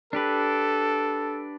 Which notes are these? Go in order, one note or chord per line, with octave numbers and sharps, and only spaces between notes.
D4 G4 A4 B4